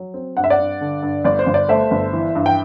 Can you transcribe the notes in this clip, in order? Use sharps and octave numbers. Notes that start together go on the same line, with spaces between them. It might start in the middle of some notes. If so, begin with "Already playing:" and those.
Already playing: F#3
C4
G2 F#5
E5
D5 F#5
G2
D3
G2
G1 D5
C5
G1
D5
A3 C5 E5
G1
E3
G2
G5